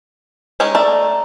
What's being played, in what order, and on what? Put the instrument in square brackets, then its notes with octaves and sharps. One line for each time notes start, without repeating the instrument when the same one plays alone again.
[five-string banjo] G#3 C#4 D#4
[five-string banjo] A3 [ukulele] D5 A#5